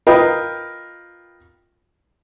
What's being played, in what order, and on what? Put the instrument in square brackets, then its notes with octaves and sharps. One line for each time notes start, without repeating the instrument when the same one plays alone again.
[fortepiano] F4 A#4 B4 D#5 G5